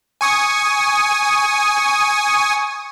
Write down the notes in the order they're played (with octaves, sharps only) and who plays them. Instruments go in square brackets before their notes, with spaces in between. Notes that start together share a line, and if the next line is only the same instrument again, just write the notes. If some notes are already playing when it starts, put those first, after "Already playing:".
[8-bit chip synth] G#5 C#6 D#6